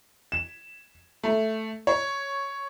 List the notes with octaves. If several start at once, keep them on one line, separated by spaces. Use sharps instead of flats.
E7
A3
C#5